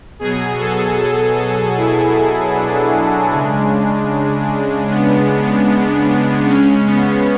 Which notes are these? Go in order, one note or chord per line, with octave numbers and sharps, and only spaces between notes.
B2 F#3 G#4
A4
A4
A4
E4
E4
D4
C#3 G#3
B3
C#3 G#3 C#4
B3